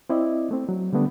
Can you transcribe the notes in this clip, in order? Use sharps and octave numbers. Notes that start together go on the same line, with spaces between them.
C4 E4 D5 D#5
A3 C4
F#3
D3 G3 A3 B3 D4